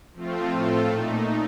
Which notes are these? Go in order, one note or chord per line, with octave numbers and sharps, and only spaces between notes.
F3 A3 C4 F4
A2 A3 C4 F4 A4
A#2 A3 D#4